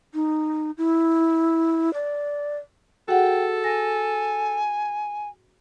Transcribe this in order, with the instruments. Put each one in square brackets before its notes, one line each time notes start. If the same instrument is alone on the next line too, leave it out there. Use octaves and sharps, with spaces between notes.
[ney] D#4
E4
D5
[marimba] F#4 G#4 F#5 [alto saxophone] A4 [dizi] G5
[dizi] G#5 [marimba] A#6